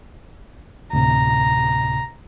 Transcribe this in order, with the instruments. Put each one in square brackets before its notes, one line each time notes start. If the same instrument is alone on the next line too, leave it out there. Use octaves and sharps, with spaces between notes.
[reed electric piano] D2 A2 C3 [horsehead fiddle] A#5